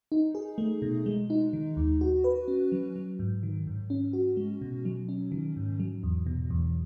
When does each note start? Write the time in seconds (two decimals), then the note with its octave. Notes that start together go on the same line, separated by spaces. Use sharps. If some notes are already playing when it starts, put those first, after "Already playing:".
0.12 D#4
0.35 G#4
0.58 A3
0.82 B2
1.06 G#3
1.30 D#4
1.53 D#3
1.77 D#2
2.01 F#4
2.24 B4
2.48 C#4
2.72 F#3
2.96 F#3
3.19 G#2
3.43 D#3
3.67 G#2
3.90 C#4
4.13 F#4
4.37 G#3
4.61 B2
4.85 F#3
5.09 C#4
5.32 D#3
5.57 G#2
5.80 F#3
6.03 E2
6.26 B2
6.50 E2